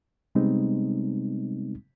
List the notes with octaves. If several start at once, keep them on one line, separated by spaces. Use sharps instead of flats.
C3 G3 G#3 B3 C4 D#4